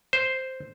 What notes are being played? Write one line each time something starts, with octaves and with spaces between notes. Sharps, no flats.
C5